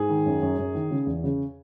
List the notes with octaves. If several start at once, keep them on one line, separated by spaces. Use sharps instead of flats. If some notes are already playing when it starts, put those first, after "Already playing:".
Already playing: G#2 G#4
D#3
F#2
F#2
F#2
D#3
C#3
E2
C#3